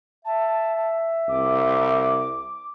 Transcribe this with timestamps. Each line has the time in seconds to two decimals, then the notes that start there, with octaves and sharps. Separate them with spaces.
0.25 E5 A5
1.29 C2 D6